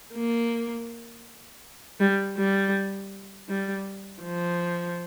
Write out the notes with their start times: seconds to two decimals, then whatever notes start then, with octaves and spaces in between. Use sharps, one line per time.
0.15 A#3
2.00 G3
2.37 G3
3.49 G3
4.23 F3